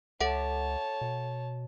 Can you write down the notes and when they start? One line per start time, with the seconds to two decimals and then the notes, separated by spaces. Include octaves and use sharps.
0.20 C#2 A4 C#5 E5 F#5 A5
1.01 B2